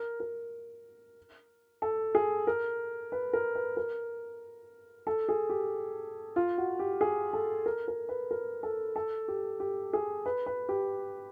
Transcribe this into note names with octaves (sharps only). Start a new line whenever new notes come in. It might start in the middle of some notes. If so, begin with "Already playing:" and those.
Already playing: A#4
A#4
A4
G#4
A#4
B4
A#4
B4
A#4
A4
G#4
G4
F4
F#4
G4
G#4
A4
A#4
A#4
B4
A#4
A4
A4
G4
G4
G#4
B4
B4
G4